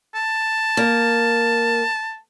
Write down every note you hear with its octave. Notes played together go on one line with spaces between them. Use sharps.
A5
A#3